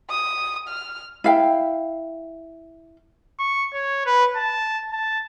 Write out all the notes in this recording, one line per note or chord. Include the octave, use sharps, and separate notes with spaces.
D#6
F6
E4 F5 G5
C#6
C#5
B4
A5
A5